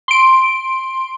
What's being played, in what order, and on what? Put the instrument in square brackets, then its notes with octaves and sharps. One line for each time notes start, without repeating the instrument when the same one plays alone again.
[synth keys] C6 D7